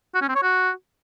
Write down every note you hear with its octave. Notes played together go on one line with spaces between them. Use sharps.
F#4
C#4
C4
C#5
F#4